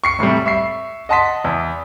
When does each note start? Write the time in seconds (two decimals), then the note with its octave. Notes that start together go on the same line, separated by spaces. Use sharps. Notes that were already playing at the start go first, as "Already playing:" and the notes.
0.04 C#6 C7 C#7
0.19 E2 A2 C3 G3
0.46 E5 C#6 C7
1.09 D#5 F#5 A5 C6 D#6 B6
1.44 E2